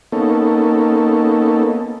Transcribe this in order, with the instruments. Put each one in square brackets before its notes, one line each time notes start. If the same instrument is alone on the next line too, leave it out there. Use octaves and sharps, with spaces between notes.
[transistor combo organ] A#3 B3 C#4 D#4 A4